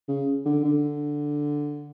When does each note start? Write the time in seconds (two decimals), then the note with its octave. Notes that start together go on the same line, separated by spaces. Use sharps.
0.08 C#3
0.45 D3
0.65 D3